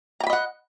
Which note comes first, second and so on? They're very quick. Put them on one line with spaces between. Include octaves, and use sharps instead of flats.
A#5 G5 B5 D#5 F#5